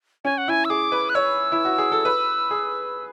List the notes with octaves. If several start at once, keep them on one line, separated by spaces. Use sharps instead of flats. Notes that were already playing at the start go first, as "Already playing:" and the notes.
C#4 G#5
F#5
E4 G#5
E6
G#4 D6
B4
F#6
C#5 E6
E4
F#4
G#4
A4
B4
G#4